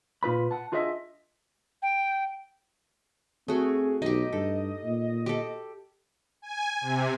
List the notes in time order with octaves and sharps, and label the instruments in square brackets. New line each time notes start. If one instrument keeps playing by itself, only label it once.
[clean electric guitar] A#2 F4 B4 B5
F#5 A5
D4 F4 G#4 B4 D#5 E5
[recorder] G5
[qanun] A3 F#4 [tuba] C4 [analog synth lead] G#4
[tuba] B1 [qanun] D#4 G4 [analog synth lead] D#5
[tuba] G2 [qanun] A4
[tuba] A#2
[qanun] G4 A4
[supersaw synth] G#5
C3